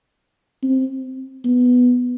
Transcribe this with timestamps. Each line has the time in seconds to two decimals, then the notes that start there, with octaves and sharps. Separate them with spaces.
0.62 C4
1.45 B3